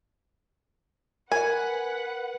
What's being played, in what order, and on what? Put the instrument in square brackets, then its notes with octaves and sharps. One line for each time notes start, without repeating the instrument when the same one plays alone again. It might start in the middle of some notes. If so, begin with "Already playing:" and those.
[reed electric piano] A#4 [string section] B4 F#5 [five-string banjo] G#5